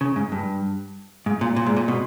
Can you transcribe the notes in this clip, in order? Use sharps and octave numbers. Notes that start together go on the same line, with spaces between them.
C#3
G#2
G2
G#2
A#2
A#2
G#2
A#2
B2